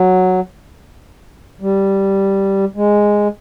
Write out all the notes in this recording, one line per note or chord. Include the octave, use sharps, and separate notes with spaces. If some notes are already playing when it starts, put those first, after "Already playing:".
Already playing: F#3
G3
G#3